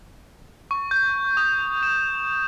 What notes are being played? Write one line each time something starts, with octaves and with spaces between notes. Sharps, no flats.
C#6
G6
D#6
E7